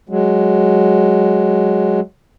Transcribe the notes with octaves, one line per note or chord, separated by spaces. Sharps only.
F#3 G#3